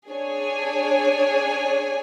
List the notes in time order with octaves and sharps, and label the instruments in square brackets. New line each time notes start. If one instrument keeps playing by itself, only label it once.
[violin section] D4 G#4 C#5 G#5